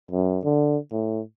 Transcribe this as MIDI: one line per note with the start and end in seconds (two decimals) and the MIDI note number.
0.11 0.39 42
0.44 0.78 50
0.92 1.21 45